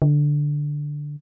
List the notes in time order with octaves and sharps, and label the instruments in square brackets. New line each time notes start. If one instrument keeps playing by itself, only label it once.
[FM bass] D3